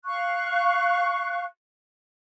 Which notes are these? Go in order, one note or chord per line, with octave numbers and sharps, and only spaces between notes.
F5 C#6 F#6